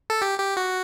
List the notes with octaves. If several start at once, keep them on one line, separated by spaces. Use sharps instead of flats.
A4
G4
G4
F#4